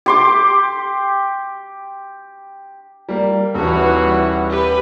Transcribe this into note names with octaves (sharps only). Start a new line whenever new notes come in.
G4 C6 D6
G3 A#3
D#1 E3 G3 F#4
G4 B4